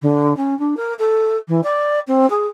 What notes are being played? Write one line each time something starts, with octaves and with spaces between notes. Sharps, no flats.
D3
C#4
D4
A#4
A4
E3
D5
C4
G#4